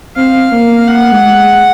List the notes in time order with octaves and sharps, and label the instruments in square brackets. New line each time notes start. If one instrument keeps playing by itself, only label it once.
[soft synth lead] C4 [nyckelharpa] F5
[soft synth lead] A#3
[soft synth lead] A#3 [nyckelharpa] F#5
[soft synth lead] G#3
G#3